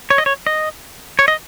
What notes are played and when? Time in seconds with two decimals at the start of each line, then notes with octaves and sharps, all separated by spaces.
0.10 C#5
0.18 D#5
0.26 C#5
0.47 D#5
1.19 C#5
1.28 D#5